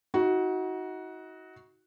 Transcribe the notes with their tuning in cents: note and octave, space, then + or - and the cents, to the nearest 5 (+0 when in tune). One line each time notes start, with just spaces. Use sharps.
D#4 +40 F#4 +0